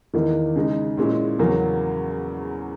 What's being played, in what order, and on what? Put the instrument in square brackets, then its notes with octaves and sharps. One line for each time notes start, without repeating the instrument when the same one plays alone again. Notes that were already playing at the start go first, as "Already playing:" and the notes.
[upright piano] E2 D#3 A#3 E4
C#3 G#3 D#4
A#2 G#3 C#4 E4
E2 C#3 F#3 A#3 C#4